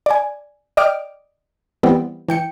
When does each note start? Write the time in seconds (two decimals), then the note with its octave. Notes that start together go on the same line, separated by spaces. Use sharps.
0.06 D5 G#5
0.77 D5 D#5 G5 D6 F6 D7
1.83 E3 G3 B3 C4
2.29 E3 G5 C#7